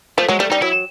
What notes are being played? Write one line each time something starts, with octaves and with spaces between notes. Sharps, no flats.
F3 A3
F#3 G#3
G3 A3
G3 D#4
F#3 E4